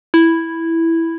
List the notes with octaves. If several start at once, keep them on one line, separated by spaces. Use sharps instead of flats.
E4